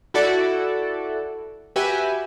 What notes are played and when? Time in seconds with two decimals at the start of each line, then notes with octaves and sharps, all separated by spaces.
0.14 E4 F#4 A4 D5
1.76 F#4 G4 B4 E5 G#5